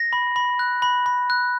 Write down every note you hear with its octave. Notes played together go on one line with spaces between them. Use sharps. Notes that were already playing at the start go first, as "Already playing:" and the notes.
Already playing: A#6
B5
B5
F#6
B5
B5
F#6